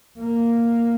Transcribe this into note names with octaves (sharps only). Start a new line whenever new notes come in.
A#3